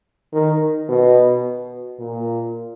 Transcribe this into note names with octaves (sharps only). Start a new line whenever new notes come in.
D#3
B2
A#2